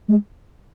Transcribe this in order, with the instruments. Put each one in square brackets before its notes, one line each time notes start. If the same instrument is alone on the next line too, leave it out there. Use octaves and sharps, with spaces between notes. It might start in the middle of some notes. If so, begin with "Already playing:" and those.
[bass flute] G#3